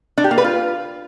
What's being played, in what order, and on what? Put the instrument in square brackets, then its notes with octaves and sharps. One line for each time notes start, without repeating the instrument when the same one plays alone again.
[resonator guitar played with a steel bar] D4
G4
A#3
B4
F4